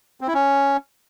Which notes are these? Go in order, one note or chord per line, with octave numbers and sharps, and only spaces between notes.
C4
E4
C#4